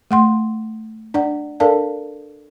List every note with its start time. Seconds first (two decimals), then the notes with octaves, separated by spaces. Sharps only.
0.11 A3 F#5 C6
1.14 D4 D5 F#5
1.60 D4 A4 A#4 D5 F5 A5